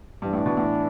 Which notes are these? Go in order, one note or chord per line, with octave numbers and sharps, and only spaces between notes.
G2 E3 B3 D4
A2
B2
A2